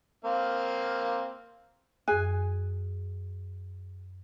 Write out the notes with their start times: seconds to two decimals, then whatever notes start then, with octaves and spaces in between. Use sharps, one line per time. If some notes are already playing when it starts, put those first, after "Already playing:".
0.24 A#3 C4 F5
2.08 F#2 G#4 G#5 F#6